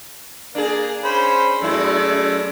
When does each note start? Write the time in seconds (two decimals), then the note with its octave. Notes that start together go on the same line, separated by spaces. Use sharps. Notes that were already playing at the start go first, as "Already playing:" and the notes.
0.55 A#3 D4 G#4
1.04 C#4 C5 B5
1.62 F#2 G#3 A3 E4 D5